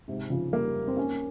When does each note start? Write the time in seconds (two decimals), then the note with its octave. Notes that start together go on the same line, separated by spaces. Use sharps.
0.08 G#2 C3
0.30 C#3 F3
0.53 G3 A#3
0.87 C4
0.97 A#3 C#4